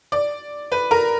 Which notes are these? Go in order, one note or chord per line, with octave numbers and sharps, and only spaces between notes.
D5
B4
A#4